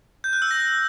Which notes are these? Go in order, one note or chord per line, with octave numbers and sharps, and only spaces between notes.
G6
F#6
E6
A#6